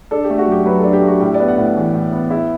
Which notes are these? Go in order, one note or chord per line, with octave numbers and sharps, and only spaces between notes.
D4 A4
G4
A3
F#4
F#2 G4
F#3 B4
D4 A4
G4
A3 F#4
A2 G4
B3 D5
F#5
A2
E3
A2
B3
E4